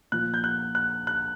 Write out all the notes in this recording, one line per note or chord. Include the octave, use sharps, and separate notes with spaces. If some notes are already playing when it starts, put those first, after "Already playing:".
A#2 F3 F#6
G6
F#6
F#6
F#6